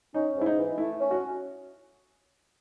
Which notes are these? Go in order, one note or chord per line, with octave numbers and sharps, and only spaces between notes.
C#4 D#4
G#2
E4
D#4
E3
A3 E4
C#4
F#4